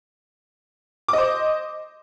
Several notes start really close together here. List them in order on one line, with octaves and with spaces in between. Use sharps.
D6 D#5 C5